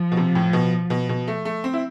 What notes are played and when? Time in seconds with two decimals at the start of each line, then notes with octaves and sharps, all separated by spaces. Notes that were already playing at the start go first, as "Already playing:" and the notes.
Already playing: F3
0.12 B2
0.17 C3
0.35 A2
0.53 B2
0.90 B2
1.09 B2
1.27 A3
1.45 A3
1.64 C4
1.73 E4